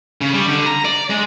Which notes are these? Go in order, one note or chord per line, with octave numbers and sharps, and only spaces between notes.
C#3
G3
D3
A#5
D5
G#3